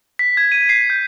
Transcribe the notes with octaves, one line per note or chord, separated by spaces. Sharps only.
B6
G#6
D#7
C7
G6